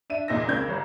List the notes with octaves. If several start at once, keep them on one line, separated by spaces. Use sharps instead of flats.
D4 E5 D#7
E2 A#2 D#4 E6 A#6
C#2 C#3 A#3 C4 G6 G#6
G1 C2